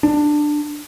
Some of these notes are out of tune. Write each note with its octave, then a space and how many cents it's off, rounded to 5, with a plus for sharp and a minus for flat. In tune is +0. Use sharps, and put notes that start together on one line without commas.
D4 +15